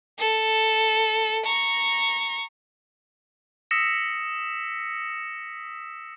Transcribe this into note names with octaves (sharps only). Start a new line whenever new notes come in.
A4
A#5 C#6
D#6 E6 A#6 B6 C#7 E7